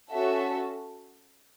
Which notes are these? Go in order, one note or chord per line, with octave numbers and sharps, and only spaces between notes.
C#4 F#4 A4 E5